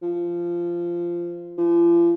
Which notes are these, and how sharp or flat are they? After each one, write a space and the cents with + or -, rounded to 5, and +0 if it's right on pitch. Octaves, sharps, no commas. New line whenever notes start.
F3 -15
F3 -40